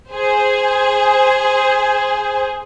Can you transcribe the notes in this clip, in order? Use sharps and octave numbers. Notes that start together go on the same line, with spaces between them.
G#4 C5